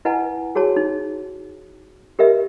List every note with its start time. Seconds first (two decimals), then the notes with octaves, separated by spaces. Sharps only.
0.05 E4 B4 D#5 F#5 G#5 A5
0.55 F#4 G#4 C#5 A5
0.76 D#4
2.19 G4 A#4 B4 D#5 E5